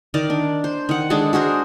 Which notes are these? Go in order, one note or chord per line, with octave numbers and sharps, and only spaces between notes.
D#3 A#4 D5
D4
C5
D#3 F#5
G#3 D4 G#4 A4
F#4 G#4 A#4 C5